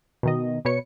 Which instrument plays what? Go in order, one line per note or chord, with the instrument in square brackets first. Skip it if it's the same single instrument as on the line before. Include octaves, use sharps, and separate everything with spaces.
[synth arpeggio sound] B2 D#3 D#5
B2 B4 C#5 C#7